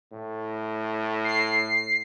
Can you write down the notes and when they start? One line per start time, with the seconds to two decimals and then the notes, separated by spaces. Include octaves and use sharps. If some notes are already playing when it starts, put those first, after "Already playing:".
0.13 A2
1.25 C7